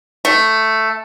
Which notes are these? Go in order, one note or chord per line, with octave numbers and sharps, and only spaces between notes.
A3